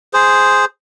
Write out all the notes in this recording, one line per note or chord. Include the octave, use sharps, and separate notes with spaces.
G#4 C5